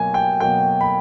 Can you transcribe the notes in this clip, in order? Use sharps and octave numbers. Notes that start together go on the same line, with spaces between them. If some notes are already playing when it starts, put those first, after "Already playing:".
Already playing: B2 F#3 A#3 G#5
G5
B2 F#3 A#3 G5
B5